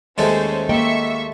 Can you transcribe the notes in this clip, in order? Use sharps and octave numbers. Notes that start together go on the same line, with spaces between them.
D#2 G#3 A3 C#4 C5
A#3 D#5 E5 G5 C#6